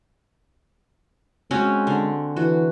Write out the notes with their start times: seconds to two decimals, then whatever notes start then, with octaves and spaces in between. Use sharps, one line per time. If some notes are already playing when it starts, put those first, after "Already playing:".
1.51 G#3 C4 C#4 F#4
1.87 D3
2.36 E3 F#4